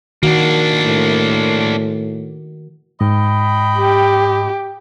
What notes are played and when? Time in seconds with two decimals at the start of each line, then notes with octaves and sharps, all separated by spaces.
0.23 D#3 A#3 D4 F#4
0.83 A2
3.01 G#2 D#5 G5 B5
3.77 G4